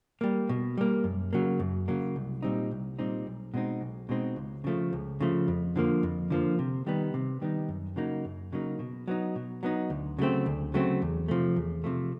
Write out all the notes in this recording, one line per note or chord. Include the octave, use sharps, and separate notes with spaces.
G3 A#3
B2
G3 A#3
F#2
C#3 F#3 A#3
F#2
C#3 F#3 A#3
C2
A#2 G3 C4 D#4
C2
A#2 G3 C4 D#4
B1
B2 G#3 C4 D#4
B1
B2 G#3 C4 D#4
C#2
C#3 F3 A3
C#2
C#3 F3 A3
F2
D3 F3 A#3
F2
D3 F3 A#3
C3
D#3 G3 B3 D#4
C3
D#3 G3 B3 D#4
F#2
C#3 F#3 A#3 D#4
F#2
C#3 F#3 A#3 D#4
B2
F#3 B3 D#4
B2
F#3 B3 D#4
D2
C#3 F#3 A3 C4
D2
C#3 F#3 A3 C4
E2
C3 F3 A3
E2
C3 F3 A3